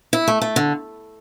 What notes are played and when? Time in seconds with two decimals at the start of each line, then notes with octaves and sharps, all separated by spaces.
0.13 E4
0.28 A3
0.42 A3
0.56 D3